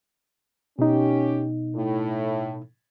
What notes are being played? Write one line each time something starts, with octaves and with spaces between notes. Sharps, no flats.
B2 C#4 D#4 G4
A2